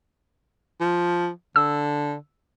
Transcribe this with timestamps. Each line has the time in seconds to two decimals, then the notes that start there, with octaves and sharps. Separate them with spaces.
0.80 F3
1.56 D3 E6